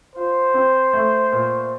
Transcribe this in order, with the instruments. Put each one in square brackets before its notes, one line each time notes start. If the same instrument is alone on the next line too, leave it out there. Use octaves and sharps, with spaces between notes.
[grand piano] F4 [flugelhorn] C5
[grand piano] C4
A3
A#2